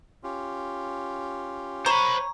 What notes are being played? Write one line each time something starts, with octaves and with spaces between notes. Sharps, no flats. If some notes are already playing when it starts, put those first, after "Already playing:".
C#4 F4 G4
C5 C#5 A#5 B5